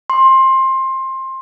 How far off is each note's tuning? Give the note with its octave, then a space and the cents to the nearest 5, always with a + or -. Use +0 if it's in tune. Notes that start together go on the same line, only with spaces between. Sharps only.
C6 +20